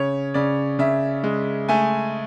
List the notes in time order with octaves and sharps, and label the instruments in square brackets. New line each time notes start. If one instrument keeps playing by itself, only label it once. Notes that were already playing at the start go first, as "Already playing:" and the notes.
Already playing: [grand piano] C#3 C#5
C#3 D5
C#3 E5
G#3
A3 G#5